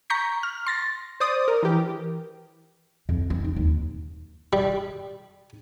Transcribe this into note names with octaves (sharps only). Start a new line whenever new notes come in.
A#5 C#6 G6 B6
F6
C6 A6 A#6
C5 D5 D#6
A#4
E3 G4
F2
C4
D#4
D#2
G3